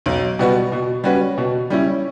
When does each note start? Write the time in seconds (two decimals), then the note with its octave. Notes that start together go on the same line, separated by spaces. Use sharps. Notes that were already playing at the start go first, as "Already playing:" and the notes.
0.06 B1
0.39 B2 G3 B3 F#4
0.72 B2
1.04 G3 C#4 F#4 B4
1.38 B2
1.70 G3 C#4 E4